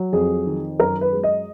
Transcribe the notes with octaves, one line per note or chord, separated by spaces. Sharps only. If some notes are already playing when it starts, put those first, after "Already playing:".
Already playing: F#3
F2 G#4
D#3
F#2 A#4
B4
G#3
D#5